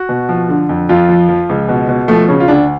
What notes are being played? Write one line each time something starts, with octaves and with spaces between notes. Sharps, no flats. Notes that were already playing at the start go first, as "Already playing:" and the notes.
Already playing: F#4
B2
F3
D3
F2
F2 F4
F3
F3
C#2
B2
B2
F3 A3
C#3 C#4
F4
D2 D4